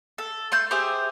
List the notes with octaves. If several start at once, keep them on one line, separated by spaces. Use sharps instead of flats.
A4
A3 C6 G6
G4 G#4 C5 E5